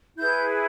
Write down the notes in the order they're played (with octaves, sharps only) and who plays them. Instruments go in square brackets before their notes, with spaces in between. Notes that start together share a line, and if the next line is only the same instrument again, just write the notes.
[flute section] E4 G#4 B4 G6